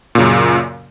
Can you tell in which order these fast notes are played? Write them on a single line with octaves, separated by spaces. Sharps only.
A#2 C#3 F#2